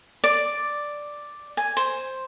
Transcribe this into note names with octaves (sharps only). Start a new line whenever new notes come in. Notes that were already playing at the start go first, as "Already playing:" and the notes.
D5
G#5
C5